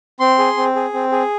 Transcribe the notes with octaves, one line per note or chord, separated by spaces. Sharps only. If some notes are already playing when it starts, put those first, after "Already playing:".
C4 C6
G#4
C4
G#4
C4
G#4